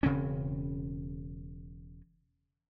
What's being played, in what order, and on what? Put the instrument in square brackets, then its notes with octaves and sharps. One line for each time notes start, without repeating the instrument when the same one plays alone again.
[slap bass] E1 C#3 C4 C#4